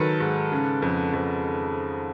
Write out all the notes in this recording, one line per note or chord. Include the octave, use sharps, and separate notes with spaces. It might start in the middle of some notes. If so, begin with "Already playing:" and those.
Already playing: D#3 F#3 A4 B4
G#2
C#3
F2
F2